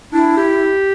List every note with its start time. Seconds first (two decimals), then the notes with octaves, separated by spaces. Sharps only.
0.13 D4 E4
0.37 G4